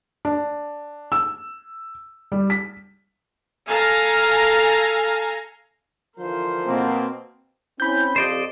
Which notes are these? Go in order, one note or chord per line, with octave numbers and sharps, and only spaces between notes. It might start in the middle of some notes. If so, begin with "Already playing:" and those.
D4
E6
G3
B6
A4 F5 G#5 A#5
D3 E3 F3 A#4 C5
B2 A#3 C4
C4 C#4 E4 B5 G6
F2 G4 C5 D5 D#5